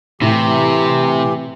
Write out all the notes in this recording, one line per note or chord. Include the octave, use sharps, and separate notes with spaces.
A2 C3 E3 G4